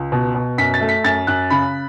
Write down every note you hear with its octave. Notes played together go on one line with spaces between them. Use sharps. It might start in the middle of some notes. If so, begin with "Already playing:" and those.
Already playing: C#2
B2
B2
F#2 B6
A6
A3
B6
F#2 A6
F#2 F#6
C#3 B5